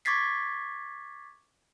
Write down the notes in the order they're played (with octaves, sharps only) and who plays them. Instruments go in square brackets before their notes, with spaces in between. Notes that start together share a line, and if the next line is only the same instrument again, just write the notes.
[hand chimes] C#6 D6 G#6 A6 B6 C7